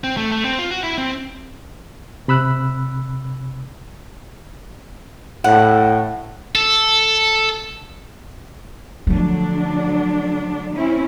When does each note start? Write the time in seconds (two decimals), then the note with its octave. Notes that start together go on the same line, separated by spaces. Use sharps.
0.04 C4
0.17 A3
0.32 A3
0.45 C4
0.59 F4
0.71 F#4
0.83 E4
0.98 C4
2.28 C3 B5 E6 F#6
5.44 A2 F#5
6.55 A4
9.07 D3 F3 F#3 A3 D4
10.74 C4 C#4 E4